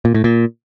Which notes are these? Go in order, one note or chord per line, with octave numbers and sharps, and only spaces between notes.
A#2
A2
A#2